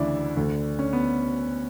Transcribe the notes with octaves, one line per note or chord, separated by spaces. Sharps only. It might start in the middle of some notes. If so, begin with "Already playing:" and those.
Already playing: D2 C#3 E3 D4 E4
D2 D3
C#4
B3